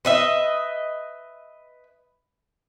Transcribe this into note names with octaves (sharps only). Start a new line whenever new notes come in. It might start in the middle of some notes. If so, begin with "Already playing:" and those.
B4 D#5 E5